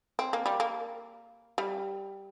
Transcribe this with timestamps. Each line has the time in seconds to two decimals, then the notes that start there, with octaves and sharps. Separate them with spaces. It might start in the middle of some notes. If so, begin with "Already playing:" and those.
0.19 C4
0.33 A#3
0.46 G3
0.60 A#3
1.58 G3